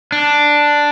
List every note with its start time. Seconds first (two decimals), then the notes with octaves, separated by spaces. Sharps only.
0.12 D4